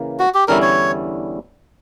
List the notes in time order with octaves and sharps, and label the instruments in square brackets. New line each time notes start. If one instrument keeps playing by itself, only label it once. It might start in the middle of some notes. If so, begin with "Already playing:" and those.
Already playing: [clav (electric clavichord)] C#3 E3 A#3
[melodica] F#4
G4
[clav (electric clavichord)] E2 D3 G3 C#4 E4 [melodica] A#4
[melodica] C#5